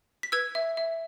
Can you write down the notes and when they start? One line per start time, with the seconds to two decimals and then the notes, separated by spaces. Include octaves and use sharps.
0.23 B6
0.32 B4 E6 G#6
0.55 E5
0.77 E5